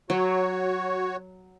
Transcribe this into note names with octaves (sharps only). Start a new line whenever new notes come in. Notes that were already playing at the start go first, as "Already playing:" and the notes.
F#3 F#4 C#5